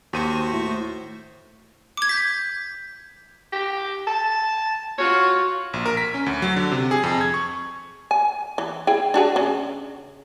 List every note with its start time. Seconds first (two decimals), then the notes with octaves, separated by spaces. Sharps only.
0.13 D#2 F#4 C5 C#6 D#7
0.53 A2
1.97 D6 G#6
2.09 G6 B6
3.52 G4
4.07 A5
4.98 F4 F#4 C#5
5.73 A#1
5.86 A#4
5.97 B6
6.14 C#4
6.26 D2
6.42 F#3
6.56 D3
6.72 C3
6.91 G#4
7.03 F2
7.21 G#6
7.34 C#6
8.11 G#5
8.58 E3
8.87 E4 G#4 G5
9.14 D4 F#4 G#4
9.36 C#3